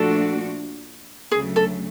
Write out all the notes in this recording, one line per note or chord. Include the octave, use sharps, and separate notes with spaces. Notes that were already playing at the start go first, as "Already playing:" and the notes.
Already playing: A#2 F3 A3 D4 F#4 A4
D2 C#3 F#3 A3 G#4
A4